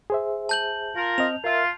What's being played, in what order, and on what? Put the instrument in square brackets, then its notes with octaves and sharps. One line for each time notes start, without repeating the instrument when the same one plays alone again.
[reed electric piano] G#4 C5 E5
[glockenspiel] A5 G6 F#7
[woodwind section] F4 A#4
[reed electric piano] C4 D#5 [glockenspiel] F7
[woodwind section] F4 [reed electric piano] A#4 E5